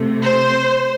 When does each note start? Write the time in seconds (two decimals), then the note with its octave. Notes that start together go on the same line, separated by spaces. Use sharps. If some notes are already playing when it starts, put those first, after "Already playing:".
Already playing: C3 A3
0.21 C5